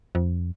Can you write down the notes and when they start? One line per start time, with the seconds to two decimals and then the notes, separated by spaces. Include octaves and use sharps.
0.15 F2